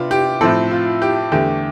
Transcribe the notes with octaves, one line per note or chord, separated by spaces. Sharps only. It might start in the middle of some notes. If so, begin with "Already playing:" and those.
Already playing: C3 B3 D4 F4
G4
A2 F3 C4 A4
F4
G4
E2 D3 A3 G4